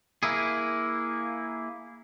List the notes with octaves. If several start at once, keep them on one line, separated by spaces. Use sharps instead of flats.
A#3 E4 G#4